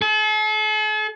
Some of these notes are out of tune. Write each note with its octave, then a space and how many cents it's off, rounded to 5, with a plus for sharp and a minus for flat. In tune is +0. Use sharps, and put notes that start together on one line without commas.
A4 -45